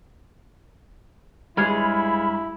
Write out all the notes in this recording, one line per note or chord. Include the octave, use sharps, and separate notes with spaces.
G2 G#3 E4 F4 G#4 C#5 B5